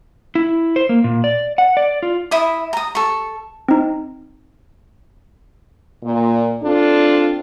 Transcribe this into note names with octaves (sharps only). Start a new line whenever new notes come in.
E4
C5
A#3
A#2
D5
F#5
D5
F4
E4 E5 D#6
A#5 D#6
A4 C#6
C4 D#4
A#2
C4 D4 F4 A4